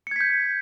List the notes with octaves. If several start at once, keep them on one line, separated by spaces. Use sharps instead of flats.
G6 G#6 B6 C#7